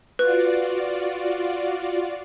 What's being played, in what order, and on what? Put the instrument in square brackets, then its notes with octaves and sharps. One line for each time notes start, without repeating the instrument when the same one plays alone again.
[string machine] F4 F#4 D5 [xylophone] B4